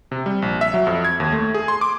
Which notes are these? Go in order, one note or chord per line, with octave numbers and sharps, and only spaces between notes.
C3
G3
A#1
E5
F#3
F2
G#6
D#2
A3
G#4
C6
D6